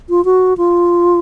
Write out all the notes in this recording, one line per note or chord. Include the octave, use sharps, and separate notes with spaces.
F4
F#4
F4